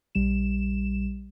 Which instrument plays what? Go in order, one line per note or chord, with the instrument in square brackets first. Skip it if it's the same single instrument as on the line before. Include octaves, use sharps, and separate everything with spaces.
[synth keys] A#1 G3 E7